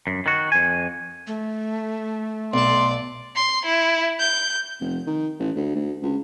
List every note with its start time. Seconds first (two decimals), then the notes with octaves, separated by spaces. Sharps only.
0.07 F#2
0.26 D#3 F#4
0.52 F2 G#5
1.27 A3
2.54 B1 D5 A5 C6
3.36 C6
3.66 E4
4.19 G6
4.80 F1
5.07 D#3
5.39 A1
5.56 D2
5.75 D2
6.02 C#2